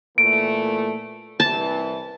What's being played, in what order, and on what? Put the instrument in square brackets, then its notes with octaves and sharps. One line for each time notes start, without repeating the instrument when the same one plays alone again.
[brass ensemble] A#2 E3 A3 [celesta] D7
[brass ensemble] C2 E3 [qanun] A5